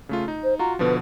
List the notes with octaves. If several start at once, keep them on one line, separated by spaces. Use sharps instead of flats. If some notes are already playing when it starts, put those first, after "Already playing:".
C#3 A3 F4
D#4
C5
F4 F#4 A#5
B2 D3 F3 B4